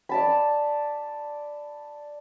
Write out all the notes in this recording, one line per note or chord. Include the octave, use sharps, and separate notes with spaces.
D5 A5 B5